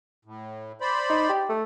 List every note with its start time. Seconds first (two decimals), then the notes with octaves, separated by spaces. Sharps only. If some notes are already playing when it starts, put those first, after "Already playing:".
0.25 A2
0.81 C5 D5 B5
1.10 D#4
1.29 G4
1.49 A3